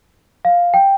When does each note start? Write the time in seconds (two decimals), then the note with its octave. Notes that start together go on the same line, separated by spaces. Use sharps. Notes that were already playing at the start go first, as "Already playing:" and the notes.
0.45 F5
0.74 G5